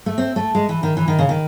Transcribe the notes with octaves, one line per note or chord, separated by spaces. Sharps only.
A3
C4
A3
G#3
E3
D#3
E3
D#3
C#3
D#3